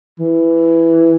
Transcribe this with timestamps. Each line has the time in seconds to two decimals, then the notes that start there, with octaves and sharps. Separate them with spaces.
0.19 E3